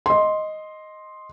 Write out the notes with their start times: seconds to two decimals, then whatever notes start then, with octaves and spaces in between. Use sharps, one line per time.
0.06 D#5 C6